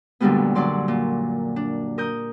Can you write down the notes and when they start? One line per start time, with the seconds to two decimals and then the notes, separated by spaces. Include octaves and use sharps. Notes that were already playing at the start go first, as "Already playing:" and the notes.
0.20 F#2 A#2 D3 G3 G#3 B3
0.55 D3 F#3 D5 C6
0.88 A#2
1.56 D4
1.98 A#4 D#6 G6